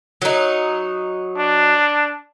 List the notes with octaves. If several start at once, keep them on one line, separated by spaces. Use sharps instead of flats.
F#3 D#4
D4